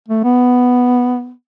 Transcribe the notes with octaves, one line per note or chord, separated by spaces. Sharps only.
A3
B3